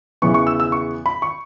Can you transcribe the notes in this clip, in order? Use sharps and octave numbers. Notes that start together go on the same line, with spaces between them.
E2 C#3 E3 B3 C#6
C#6
E6
E6
C#6
B5
C#6